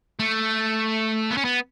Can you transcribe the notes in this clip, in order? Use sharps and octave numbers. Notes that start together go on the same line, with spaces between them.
A3
B3
C#4
B3